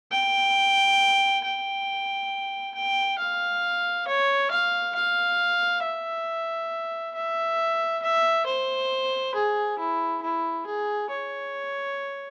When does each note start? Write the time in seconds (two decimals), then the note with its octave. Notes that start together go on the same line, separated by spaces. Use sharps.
0.11 G5
1.44 G5
2.75 G5
3.18 F5
4.08 C#5
4.51 F5
4.95 F5
5.83 E5
7.15 E5
8.02 E5
8.46 C5
9.35 G#4
9.79 E4
10.22 E4
10.66 G#4
11.10 C#5